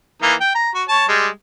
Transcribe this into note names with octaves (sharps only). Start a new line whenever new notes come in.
E3 A#3 D#4
G5
A#5
F#4
C#5 A5
G3 G#3